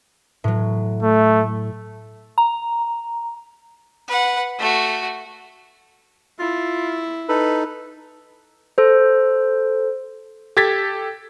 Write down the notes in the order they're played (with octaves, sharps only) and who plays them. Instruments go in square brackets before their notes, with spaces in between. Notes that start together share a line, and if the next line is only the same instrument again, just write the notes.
[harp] A2 F#3
[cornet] A3
[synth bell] A#5
[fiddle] B4 F#5
A3 F#4
[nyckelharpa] E4 [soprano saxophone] F4
[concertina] D#4 A4 [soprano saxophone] B4
[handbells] A4 C5
[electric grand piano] G4 A4 G#6 A6 B6